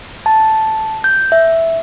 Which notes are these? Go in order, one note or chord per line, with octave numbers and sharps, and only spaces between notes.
A5
G6
E5